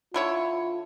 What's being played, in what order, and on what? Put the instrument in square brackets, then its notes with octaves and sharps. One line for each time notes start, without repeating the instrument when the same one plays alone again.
[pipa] D3 E4 C#5 [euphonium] F4